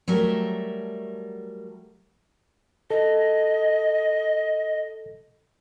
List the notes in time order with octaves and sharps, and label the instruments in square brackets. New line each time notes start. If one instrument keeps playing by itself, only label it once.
[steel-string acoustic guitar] F#3 G3 A3 A#4 E5
[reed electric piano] A4 [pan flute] D#5